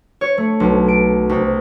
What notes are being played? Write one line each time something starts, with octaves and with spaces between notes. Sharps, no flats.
C#5
A3
B1
D7
C2